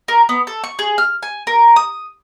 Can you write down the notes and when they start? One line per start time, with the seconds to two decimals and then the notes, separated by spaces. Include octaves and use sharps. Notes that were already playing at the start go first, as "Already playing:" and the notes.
0.08 A#4
0.29 B3
0.47 A4
0.64 C#6
0.79 G#4
0.98 F6
1.23 G#5
1.47 A#4
1.76 D#6